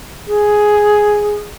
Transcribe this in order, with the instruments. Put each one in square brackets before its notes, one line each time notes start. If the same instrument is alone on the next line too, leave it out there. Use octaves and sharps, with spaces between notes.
[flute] G#4